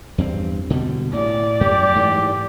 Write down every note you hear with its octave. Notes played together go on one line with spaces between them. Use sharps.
E2 G2 C4
B2 D3 G3
A2 D5
F#2 A3 G4
G#2 E3 A3